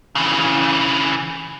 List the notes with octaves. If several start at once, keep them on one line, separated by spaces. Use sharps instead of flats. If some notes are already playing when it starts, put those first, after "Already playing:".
C#3 E3